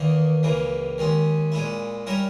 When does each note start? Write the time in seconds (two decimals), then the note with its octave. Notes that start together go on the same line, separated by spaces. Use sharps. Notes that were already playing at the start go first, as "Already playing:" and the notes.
Already playing: E2 D#3 A#3
0.43 C#2 C#3 E3 A#3
0.98 D#2 D#3 G#3 C#4
1.52 A#2 G#3 C#4 E4
2.07 G3 C#4 E4 A#4 C#5